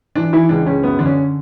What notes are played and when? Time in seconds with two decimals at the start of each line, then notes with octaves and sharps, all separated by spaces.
0.15 E3 D4
0.33 E3 E4
0.49 C#2 D4
0.66 C#2 C#4
0.83 F#2 B3
0.99 D3 D4
1.06 C#4